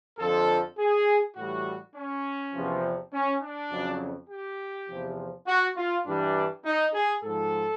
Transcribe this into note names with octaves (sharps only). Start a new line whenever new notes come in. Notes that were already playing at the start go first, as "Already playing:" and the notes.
F2 D3 F3 A4
G#4
A2 E3 G3 F#4
C#4
E2 C3 F3
C#4
D4
F2 C#3 F#3
G4
E2 C3 F3
F#4
F4
G2 E3 G3 D4
D#4
G#4
G#2 F3 A4